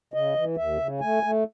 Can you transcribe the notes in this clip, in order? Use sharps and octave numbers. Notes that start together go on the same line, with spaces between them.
C#3 D#5
E3
D#2 E5
C#3
A3 G#5
A3